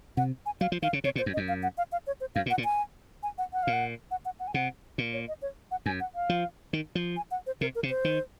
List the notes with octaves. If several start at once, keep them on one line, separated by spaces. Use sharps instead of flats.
C3 F#5
G#5
F#3 F5
F3
D#3 F5
C#3
C3 C#5
A#2
C5
F#2
D#5
F#2
F5
F#5
F5
F5
C#5
C5
F#2 F5
A#2
F#5
A#2
G#5
G#5
F#5
F#5
A#2 F5
F#5
F#5
F#5
F#5
G#5
C3 F#5
A#2
C#5
D#5
C#5
F#5
F#2 G#5
F#5
F5
F3
D#3
F3
G#5
F#5
C5
C3 A#4
A#4
C3
C5
D#3